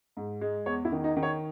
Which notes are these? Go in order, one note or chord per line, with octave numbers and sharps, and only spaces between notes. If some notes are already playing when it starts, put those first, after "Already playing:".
G#2
G#3
E2 C#5
E4
D#3
D#4
D#3
C#5